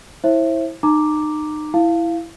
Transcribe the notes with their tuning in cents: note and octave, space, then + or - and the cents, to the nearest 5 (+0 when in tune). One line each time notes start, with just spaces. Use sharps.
E4 -15 C5 +35 E5 +15
D#4 -30 A#5 -5 D6 +0
E4 +10 F5 -10